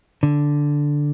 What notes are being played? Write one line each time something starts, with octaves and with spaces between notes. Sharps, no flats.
D3